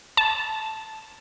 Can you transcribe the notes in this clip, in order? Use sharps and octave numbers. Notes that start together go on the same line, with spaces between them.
A5